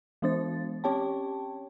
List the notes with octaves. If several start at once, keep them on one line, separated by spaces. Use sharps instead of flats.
E3 G#3 B3 D4 C5 A6
C4 C#4 G4 C#5 G5 A5